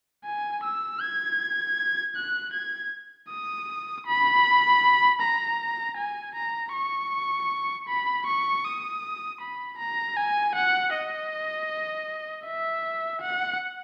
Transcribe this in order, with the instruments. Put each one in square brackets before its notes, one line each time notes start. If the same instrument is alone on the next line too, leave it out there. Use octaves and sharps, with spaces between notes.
[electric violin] G#5
E6
G#6
F#6
G#6
D#6
B5
A#5
G#5
A#5
C#6
B5
C#6
D#6
B5
A#5
G#5
F#5
D#5
E5
F#5